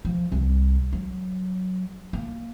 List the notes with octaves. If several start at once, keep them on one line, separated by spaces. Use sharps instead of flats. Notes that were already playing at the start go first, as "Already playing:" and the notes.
F3
C2
F#3
A#3